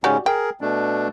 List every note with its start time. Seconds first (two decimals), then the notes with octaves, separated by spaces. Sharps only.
0.04 G#2 C#3 C#4 F#4 G4 D5
0.26 G#4 A#4 G5
0.61 B2 A3 D4